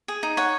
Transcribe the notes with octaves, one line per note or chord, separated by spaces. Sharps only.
G#4
D#4
C#5 F#5